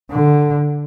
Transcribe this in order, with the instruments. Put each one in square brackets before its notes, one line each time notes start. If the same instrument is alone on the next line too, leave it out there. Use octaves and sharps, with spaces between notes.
[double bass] D3